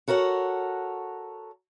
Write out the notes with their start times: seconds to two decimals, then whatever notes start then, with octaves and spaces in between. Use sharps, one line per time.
0.08 F#4 A4 A#4 C#5 F#5